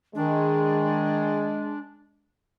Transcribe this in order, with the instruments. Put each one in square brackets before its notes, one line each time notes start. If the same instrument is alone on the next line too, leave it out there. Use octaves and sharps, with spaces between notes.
[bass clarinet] D#3 [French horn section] G#3 [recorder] D4